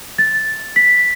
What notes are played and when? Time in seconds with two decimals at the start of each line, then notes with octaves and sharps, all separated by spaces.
0.18 A6
0.76 B6